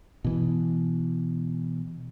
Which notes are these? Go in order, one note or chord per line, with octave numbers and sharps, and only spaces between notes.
B2 E3